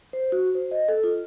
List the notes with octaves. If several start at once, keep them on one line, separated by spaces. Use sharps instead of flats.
C5
F#4
C5
D#5
A4
F4